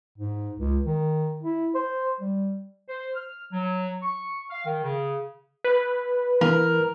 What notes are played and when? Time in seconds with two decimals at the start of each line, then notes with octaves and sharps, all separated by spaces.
0.18 G#2
0.57 C#2
0.86 D#3
1.43 E4
1.75 C5
2.20 G3
2.89 C5
3.15 F6
3.53 F#3
4.02 C#6
4.50 F5
4.65 D#3
4.84 C#3
5.64 B4
6.41 E3 A#4